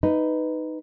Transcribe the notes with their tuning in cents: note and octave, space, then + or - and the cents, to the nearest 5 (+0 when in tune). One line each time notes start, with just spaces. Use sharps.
D#4 +0 B4 +10